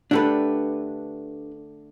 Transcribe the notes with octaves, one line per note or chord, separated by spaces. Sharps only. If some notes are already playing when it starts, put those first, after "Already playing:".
D3 A3 D4 G4 B4